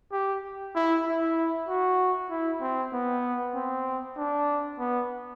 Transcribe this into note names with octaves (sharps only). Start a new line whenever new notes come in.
G4
E4
E4
F#4
E4
C4
B3
C4
D4
B3